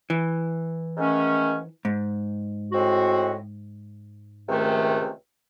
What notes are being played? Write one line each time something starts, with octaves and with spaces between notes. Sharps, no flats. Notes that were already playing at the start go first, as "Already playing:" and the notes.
E3
G#2 D#3 A3 C#4
G#2
A2 G#3 C4 F#4
C#2 C3 D#3 A3